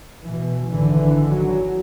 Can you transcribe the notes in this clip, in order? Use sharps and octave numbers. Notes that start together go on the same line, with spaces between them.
B2 E3
G#1 D3 E3
F#3